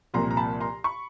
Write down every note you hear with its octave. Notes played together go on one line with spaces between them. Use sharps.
C2 A#2 F3 A#5 C6
A#5
A5 B5
A#5 C6
B5 C#6